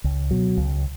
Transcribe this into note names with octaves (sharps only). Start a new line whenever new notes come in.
C#2
B2 F#3
C#2